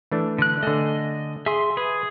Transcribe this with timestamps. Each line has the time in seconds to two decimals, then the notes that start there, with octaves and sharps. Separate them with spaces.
0.11 E3 A3 D4
0.38 D3 F#6
0.63 D3 A3 D#5 G#5
1.46 G#4 E5 C6
1.77 G#4 B4